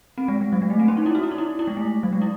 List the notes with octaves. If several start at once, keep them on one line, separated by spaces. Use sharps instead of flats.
C4
G#3
G#3
F#3
G#3
A3
C4
C#4
D#4
E4
F#4
E4
D#4
E4
E4
G#3
A3
F#3
G#3
E4